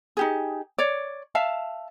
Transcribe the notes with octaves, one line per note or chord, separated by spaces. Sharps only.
D#4 G4 G#4
C#5 D5
E5 F5 A5